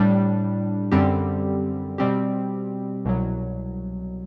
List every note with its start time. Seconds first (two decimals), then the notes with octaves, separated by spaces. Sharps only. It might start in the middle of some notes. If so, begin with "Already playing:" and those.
Already playing: A2 G3 D4
0.91 F#2 D3 G3 C4 G4
1.98 B2 G3 C4 G4
3.05 C2 B2 F#3